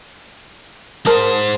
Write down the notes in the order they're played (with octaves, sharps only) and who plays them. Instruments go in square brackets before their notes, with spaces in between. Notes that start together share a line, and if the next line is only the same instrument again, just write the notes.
[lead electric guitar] G#3 C5 [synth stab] A#4 A5 D#6